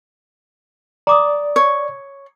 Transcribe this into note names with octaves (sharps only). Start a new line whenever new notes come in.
D5 A#5 D6 D#6
C#5